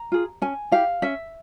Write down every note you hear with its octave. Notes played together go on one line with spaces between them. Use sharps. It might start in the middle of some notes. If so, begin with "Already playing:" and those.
Already playing: A#5
F4 G#4
C#4 G#5
E4 G4 F5
C#4 E5